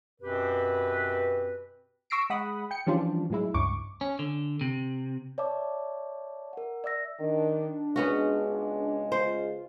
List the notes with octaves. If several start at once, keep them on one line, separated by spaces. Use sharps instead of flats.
F#2 B2 C4 G4 B4
C#6 E6 A#6 C7 D7
G#3 F#5 B5 D#6
G5 C#7
E3 F3 G3 C#4 D4 F4
A2 F#3 G#3 E4
C#2 G2 C#6 D6
C#4
D3
C3
C#5 D5 E5 A5 D6
A#4 F#5
D5 E5 E6 A#6
D#3 D4
C#2 G#3 B3 C#4 F#4
F4 C5